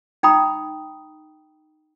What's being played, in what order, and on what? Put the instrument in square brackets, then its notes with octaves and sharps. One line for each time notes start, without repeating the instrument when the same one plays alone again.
[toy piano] D#4 G5 A#5 B5 D#6